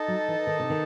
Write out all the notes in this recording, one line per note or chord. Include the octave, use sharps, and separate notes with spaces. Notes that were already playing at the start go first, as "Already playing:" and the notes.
Already playing: D#4 A4 D#5 A5
F#3
E3
D#3
C3
D#3